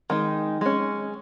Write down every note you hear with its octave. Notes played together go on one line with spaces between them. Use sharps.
D#3 G#3 D#4
G#3 C#4